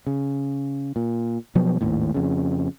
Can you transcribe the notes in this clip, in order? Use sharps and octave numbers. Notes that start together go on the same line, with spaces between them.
C#3
A#2
B2 F3 F#3 B3
G#1 D#2 A2
F2 C#3